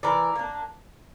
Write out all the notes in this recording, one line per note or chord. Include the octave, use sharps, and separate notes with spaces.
E3 A#4 D5
A#3 D4